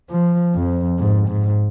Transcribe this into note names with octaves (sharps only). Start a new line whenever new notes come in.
F3
F2
G#2
G#2